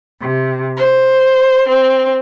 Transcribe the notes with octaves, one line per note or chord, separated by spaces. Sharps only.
C3
C5
C4